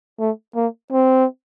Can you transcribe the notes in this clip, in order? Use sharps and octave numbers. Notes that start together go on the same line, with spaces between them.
A3
A#3
C4